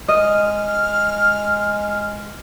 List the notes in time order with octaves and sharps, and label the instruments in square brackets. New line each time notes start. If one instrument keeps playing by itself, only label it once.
[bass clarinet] G#3 [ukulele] D#5 [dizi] F6